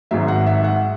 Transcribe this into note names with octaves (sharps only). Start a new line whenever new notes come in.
G#1 G#2 F#3 E5
F#5
E5
F#5